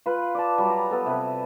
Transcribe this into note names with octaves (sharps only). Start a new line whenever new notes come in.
F4 B4
D5 A5
F#3 G3
A#5
B3 A4
C3 B4